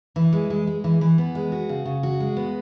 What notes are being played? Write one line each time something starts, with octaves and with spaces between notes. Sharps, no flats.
E3
G#3
G#3
G#3
E3
E3
B3
G#3
F#4
C#3
C#3
F#4
G#3
B3